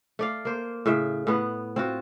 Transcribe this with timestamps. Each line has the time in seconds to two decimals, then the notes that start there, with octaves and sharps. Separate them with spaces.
0.19 A3 D5 F5
0.45 A#3 C5
0.86 A2 C#3 E5
1.27 A2 B3 B4
1.76 C4 F4 F#4